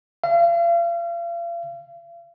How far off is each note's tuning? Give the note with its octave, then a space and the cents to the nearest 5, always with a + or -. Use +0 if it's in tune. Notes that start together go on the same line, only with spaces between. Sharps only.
F5 -40